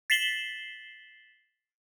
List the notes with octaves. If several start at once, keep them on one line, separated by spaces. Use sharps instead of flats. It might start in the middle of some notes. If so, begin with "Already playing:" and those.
A6 B6 C7 E7 F#7 G7